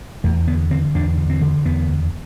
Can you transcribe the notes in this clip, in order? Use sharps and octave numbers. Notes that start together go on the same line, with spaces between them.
E2 A3
D3 B3
D3 C4
E2 D4
D3
C4
D3
E2 B3
E2